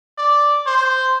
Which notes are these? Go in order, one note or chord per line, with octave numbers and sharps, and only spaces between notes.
D5
C5